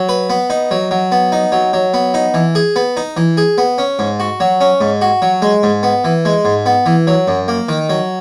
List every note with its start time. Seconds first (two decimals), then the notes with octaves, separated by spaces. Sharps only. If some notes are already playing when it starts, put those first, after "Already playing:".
Already playing: F#3
0.09 B4
0.30 B3
0.50 D#4
0.71 F#3
0.91 F#3
1.12 B3
1.32 D#4
1.52 F#3
1.73 F#3
1.94 B3
2.14 D#4
2.34 E3
2.55 G#4
2.76 B3
2.97 D#4
3.17 E3
3.37 G#4
3.58 B3
3.78 C#4
3.99 G#2
4.20 F#4
4.40 F#3
4.61 C#4
4.81 G#2
5.01 F#4
5.22 F#3
5.42 G#3
5.63 G#2
5.83 B3
6.04 E3
6.25 G#3
6.45 G#2
6.66 B3
6.86 E3
7.07 F#3
7.28 F#2
7.48 A#3
7.69 D#3
7.90 F#3